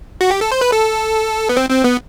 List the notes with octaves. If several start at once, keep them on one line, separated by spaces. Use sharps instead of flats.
F#4
G4
A4
C5
B4
A4
B3
C4
C4
B3